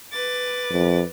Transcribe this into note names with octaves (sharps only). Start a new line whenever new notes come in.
B4 D6 A6
F2